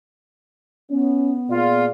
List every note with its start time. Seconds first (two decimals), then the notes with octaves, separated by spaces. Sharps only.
0.91 B3 C#4
1.50 A#2 F4 G#4 D5